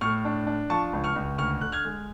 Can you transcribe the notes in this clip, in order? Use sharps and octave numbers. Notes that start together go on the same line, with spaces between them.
A2 C#6 F6
D4
D4
F3 A5 C#6
C#2
C#6 F6
C#2
D2 C#6 F6
D3 F#6
F6 G#6
G#3